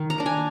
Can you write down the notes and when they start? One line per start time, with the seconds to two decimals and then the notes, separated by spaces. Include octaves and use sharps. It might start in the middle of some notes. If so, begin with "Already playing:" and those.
Already playing: D#3
0.10 A#5
0.18 A#3 D4
0.26 G#5